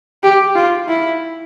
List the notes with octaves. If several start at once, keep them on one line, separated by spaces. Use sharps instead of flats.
G4
F4
E4